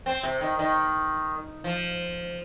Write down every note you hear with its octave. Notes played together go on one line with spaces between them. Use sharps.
C4
C3
D#3
D#3
F3